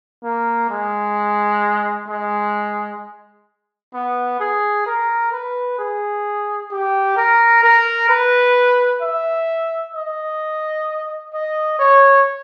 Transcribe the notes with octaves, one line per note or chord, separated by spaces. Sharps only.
A#3
G#3
G#3
B3
G#4
A#4
B4
G#4
G4
A#4
A#4
B4
E5
D#5
D#5
C#5